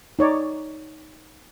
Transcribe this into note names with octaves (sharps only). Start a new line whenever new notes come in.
D#4 C#5 D5